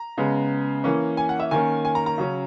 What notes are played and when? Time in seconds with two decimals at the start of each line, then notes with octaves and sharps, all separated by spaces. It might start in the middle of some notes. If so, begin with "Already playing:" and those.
Already playing: A#5
0.18 C#3 G#3 B3
0.84 E3 A#3 C#4
1.17 G#5
1.29 F#5
1.40 E5
1.51 D#3 A#3 C#4 G#5
1.85 G#5
1.95 A#5
2.06 A#5
2.18 C#3 F#3 C#4